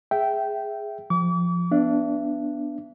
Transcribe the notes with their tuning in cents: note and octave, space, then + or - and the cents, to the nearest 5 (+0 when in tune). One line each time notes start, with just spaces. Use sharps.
G#4 +0 E5 +5 G5 -15
F3 +0 D6 -40
B3 +0 D4 +0 E5 +35